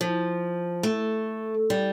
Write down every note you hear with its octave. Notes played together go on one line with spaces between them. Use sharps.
F3
A3
G3